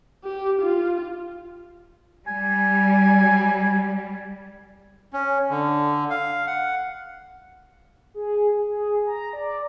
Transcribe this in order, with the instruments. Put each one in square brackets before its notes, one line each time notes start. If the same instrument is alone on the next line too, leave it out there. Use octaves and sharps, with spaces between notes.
[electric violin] G4
F4
[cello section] G3 [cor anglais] G#5
[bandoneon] C#4
D3
F5
F#5
[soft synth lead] G#4
G#4
A#5
D5